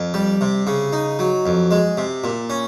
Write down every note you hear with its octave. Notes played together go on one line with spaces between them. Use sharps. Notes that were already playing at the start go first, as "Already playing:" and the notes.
Already playing: F2
G3
C3
C#3
D#4
F#3
F2
G#3
C3
A#2
C#4